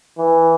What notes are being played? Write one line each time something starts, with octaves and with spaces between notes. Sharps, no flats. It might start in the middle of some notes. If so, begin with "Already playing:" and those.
E3